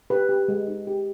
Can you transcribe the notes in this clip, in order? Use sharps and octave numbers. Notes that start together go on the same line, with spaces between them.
G4 B4
G4
G#3
D#4
G4